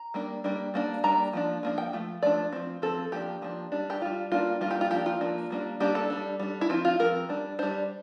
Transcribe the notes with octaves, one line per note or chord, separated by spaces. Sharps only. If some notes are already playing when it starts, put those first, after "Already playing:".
Already playing: A#5
G3 A#3 D4
G3 A#3 D4
G3 A#3 D4
G3 A#3 D4 A#5
F3 A#3 D4
F3 A#3 D4
G5
F3 A3
F3 A3 D4 D5
F3 C4
F3 C4 A4
F3 A#3 D4 G4
F3 A#3 D4
G3 D4
G4
G3 D4 F4
G3 A#3 D4 F4
G3 A#3 D4 F4
G4
F4
F3 A#3 D4 G4
F4
F3 A#3 D4
G3 A#3 D4
G3 A#3 D4 G4
A4
G3 D4
G3 D4
E4
F3 C4 F4
F4
F3 C4 A#4
G3 D4
G3 D4 C5